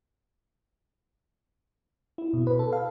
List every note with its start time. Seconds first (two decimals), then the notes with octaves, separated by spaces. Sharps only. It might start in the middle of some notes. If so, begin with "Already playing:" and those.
2.18 E4
2.33 B2
2.47 B4
2.59 A4
2.73 F5